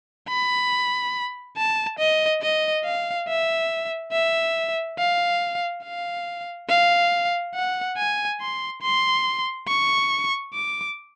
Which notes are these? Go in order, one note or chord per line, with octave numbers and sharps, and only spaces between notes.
B5
A5
D#5
D#5
F5
E5
E5
F5
F5
F5
F#5
G#5
C6
C6
C#6
D6